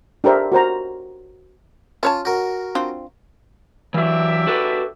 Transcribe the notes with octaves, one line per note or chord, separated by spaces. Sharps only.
D4 G4 A#4 C5 E5
F#4 A#4 C5 A#5
C#4 F4 C#5 A5
F#4 A#4
C4 D4 F4
E3 F#3 D4 G4 E5
F#4 A4 B4